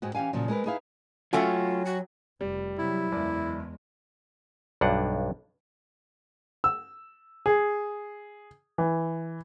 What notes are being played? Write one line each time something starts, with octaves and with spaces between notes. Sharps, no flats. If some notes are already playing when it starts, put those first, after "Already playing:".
G#2 G#3 C4 F#4
E3 C#4 G4 F5 G#5
A#2 C#3 F3 F#3
G#3 C4 A#4 B4
D#4 E4 G#4 B4 E5 F5
F#3 A3 C#4 F4 F#4 G5 G#5
F#4
F1 G3
C3 F#3 E4
F#1 E2 G#3 D5
B1 G2 D4 F#5
E6
G#4
E3